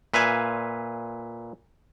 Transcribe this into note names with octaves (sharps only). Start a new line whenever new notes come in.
A#2 B4 E5 F5 G#5